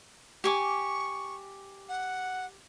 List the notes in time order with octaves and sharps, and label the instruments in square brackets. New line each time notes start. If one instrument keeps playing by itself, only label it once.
[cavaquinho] G4 G#5 D6 [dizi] C#6
[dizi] F#5